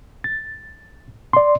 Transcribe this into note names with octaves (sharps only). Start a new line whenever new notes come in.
A6
D5 C6